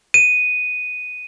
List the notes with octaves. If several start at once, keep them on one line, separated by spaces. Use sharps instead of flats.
D#7